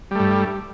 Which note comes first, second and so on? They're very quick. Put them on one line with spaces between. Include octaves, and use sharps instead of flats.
G3 A3 G2